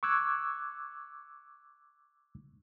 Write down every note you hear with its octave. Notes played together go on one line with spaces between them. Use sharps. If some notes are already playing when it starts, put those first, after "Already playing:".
C#6 D6 E6 F#6 G#6